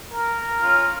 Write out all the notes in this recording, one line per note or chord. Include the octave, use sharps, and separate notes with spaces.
A#4
C#4 F4 F6